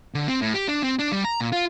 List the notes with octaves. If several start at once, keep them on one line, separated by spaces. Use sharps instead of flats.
D3
C4
A2
G4
D4
C4
D4
G3
A#5
A#2
F4